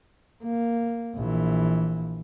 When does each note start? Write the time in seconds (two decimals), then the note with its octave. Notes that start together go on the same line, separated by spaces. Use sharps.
0.43 A#3
1.15 A#1 E3